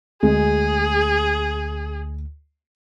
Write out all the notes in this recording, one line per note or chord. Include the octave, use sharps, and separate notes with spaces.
D2 G#3 G#4